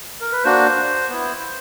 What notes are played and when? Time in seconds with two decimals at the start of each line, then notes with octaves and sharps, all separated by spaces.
0.21 A#4
0.32 B4
0.44 A#3 D4 F#4 C5
1.09 B3 E4